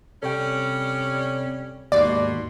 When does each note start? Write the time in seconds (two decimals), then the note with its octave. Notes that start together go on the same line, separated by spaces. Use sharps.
0.23 C3 G3 C#4 A4 C#5 G5
1.92 D#2 G#2 B2 D5 C6